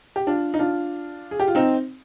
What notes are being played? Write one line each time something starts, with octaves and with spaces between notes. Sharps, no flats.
G4
D4 F4
D#4
D4 F4
G#4
G4
F4
C4 D#4